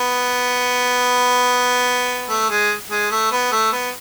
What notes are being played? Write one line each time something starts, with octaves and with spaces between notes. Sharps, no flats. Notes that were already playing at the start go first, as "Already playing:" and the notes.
Already playing: B3
A3
G#3
G#3
A3
B3
A3
B3